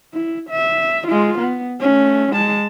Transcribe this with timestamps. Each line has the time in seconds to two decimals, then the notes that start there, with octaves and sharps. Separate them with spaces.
0.13 E4
0.50 E5
1.08 G#3 F4
1.39 B3
1.80 A3 C#4
2.32 G#3 A5